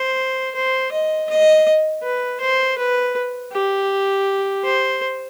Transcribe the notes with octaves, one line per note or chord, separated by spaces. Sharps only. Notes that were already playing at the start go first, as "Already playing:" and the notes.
Already playing: C5
C5
D#5
D#5
B4
C5
B4
G4
C5